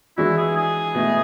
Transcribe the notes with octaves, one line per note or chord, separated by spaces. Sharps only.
E3 G#3 D4 E4 F#4
G#4
G#4
B2 A3 E4